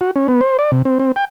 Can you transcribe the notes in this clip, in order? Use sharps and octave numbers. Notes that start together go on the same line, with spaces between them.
F#4
C#4
B3
C5
D5
C3
C4
C4
G5